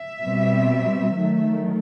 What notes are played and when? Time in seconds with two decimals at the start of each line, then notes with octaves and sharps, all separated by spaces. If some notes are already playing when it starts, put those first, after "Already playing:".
Already playing: E5
0.23 B2 G3 C4
1.15 D#3 F#3 A3